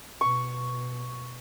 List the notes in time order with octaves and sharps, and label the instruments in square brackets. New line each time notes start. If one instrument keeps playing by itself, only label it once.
[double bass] B2 [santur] C#6